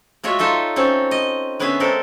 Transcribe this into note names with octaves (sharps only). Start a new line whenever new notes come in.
G#3 F4 F#4 C#5 E5
D#4 F4 A4 E5
C4 C#4 A4
D#5
D3 B3 C#4 G#4 E5
G#3 C4 A4 A#4